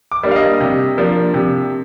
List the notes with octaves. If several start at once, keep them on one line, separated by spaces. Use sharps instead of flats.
D6
G3 A#3 D4
F5
D#5
C3
F3 A#3 D4
C3